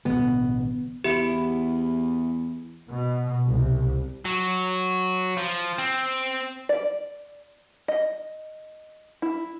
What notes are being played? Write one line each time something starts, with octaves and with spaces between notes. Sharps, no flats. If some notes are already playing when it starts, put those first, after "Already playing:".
A1 B2 D3 B3
E2 B3 E4 G4
B2
C2
F#3
F3
C4
D5
D#5
E4